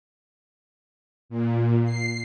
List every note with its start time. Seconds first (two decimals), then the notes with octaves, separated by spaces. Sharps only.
1.29 A#2
1.85 C7